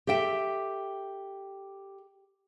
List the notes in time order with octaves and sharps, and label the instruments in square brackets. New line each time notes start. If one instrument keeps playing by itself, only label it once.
[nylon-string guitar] G4 A4 E5 G5